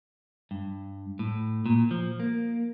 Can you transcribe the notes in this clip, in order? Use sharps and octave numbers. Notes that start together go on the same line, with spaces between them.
G2
A2
A#2
F3
A#3